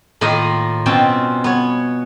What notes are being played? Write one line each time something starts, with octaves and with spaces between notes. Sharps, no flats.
A2 D#3 A#3 D#4 F4 D#5
B2 C4 C#4 G5 A5
B3 C#5